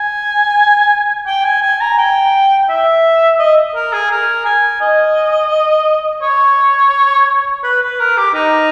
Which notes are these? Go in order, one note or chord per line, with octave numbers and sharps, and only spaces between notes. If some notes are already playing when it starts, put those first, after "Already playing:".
Already playing: G#5
G5
G#5
G#5
A#5
G5
E5
D#5
A#4
G#4
A#4
G#5
D#5
C#5
B4
B4
A#4
G4
D#4